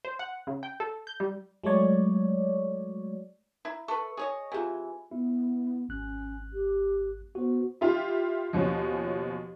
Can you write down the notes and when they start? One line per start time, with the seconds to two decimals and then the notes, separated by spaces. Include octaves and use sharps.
0.05 C5
0.19 F#5
0.47 C#3
0.63 G5
0.80 A4
1.07 G6
1.20 G3
1.64 F#3 G#3 A3 C#5 D5
3.65 E4 A#5
3.88 A4 B4 C#6
4.17 G#4 C#5 D#5
4.52 C3 E3 F4 G#4 G#5
5.11 B3 E4
5.89 G#1 C#4 F#6
6.53 G4
7.35 B3 F#4 C5
7.81 E4 F4 G4
8.53 D#2 B2 F3 C#4